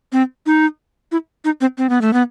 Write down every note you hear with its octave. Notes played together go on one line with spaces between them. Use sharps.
C4
D#4
E4
D#4
C4
C4
B3
A3
B3